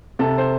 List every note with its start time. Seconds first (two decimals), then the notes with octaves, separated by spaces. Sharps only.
0.19 C3 A4
0.38 C5